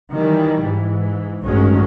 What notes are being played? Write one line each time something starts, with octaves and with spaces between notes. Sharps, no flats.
D#3 E3 G3
G#2 E3
A1 G2 D#3 F#3 G#3 C#4